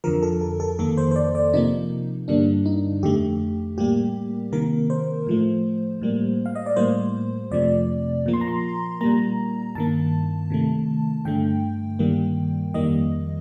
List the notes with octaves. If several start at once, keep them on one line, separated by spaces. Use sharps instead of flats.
F2 D3 F3 A#4
A4
A4
A4
F2 D#3 A#3 A4
C5
C5
D5
D5
C3 F3 A#3 D#4
G2 D3 G3 A#3 D4
D#4
F2 D3 A3 G4
A2 G3 A#3 G4
C3 D#3 A#3 A#4
C5
A2 F3 A3
A2 G3 A#3
F5
D#5
D5
A2 G3 A#3 C5
F2 C3 F3 A3 D5
A#2 F3 A#3
C6
A#5
C6
A#2 G3 A#3 A#5
G2 D#3 A#3 A5
C3 D#3 A3
G2 D3 A3 G5
G2 D#3 G3 A#3
F2 D#3 G3 A#3 D#5